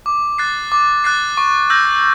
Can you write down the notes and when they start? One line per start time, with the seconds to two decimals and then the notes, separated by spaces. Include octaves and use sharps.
0.06 D6
0.38 F#6 A6 C7
0.72 D6
1.04 F#6 A6 C7
1.37 C#6
1.70 E6 G6 A#6